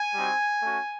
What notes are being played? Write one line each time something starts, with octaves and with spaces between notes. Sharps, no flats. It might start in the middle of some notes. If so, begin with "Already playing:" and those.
Already playing: G#5
G3 C4 D#4 F#4
A3 C#4 F#4